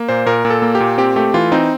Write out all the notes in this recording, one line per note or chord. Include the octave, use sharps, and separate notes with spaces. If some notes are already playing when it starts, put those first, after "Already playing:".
Already playing: A#3
A#2 C5
A#2 A#4
A#2
A4
A#3
G4
A#2
C4 G4
A3 G4
E3 F4
C4 D#4